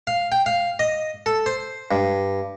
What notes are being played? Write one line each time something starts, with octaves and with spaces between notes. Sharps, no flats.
F5
G5
F5
D#5
A4
C5
G2